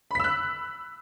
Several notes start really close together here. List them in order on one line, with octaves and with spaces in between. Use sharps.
B5 B6 E6 F#6